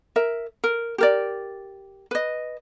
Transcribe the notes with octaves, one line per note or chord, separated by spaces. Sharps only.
A#4 E5
A#4
G4 A#4 D5
B4 D#5